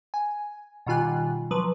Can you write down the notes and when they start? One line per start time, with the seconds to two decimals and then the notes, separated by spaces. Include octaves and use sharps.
0.14 G#5
0.86 B2 D#3 G3 F4 G#5 F#6
1.51 F3 F#3 B4